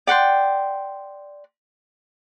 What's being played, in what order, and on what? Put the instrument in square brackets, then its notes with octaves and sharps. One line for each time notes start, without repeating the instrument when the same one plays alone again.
[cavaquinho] D5 F#5 G5 C6